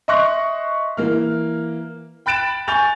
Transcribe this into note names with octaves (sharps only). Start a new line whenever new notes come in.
D#5 E5 C6 C#6 F#6 A#6
E3 A#3 F6
G5 B5 F#6 A6 D7 E7
G#5 C#6 G6 A6 F7